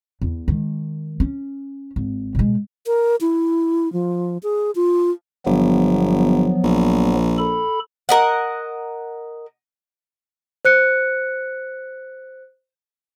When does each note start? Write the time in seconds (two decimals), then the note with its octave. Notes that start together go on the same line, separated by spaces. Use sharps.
0.22 E2
0.48 D#3 G#3
1.20 C#4
1.96 G#1
2.35 B2 G#3
2.87 A#4
3.21 E4
3.93 F3
4.43 G#4
4.75 F4
5.46 G1 F3 F#3 B3
6.64 A#1
7.38 A4 B5
8.09 A#4 D#5 F#5
10.65 C5 F#6 C#7